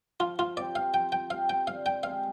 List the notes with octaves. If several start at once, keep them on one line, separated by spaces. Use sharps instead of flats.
F3 F4
F4
C4 G4 D5
F5
F3 G5
G5
C4 G4 F5
G5
D3 F5
G5
G#3 C4 G4 F5